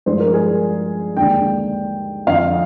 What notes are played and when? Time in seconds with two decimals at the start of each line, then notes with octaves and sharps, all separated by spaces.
0.06 G2 F3 G#3 C5
0.20 A#4
0.34 G#4
0.48 A#4
1.17 D#2 D3 G#3 G5
2.27 F2 D3 F3 F5